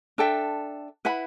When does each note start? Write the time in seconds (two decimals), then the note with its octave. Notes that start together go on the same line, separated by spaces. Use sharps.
0.18 D4 A4 E5 G5
1.05 E4 B4 F#5 B5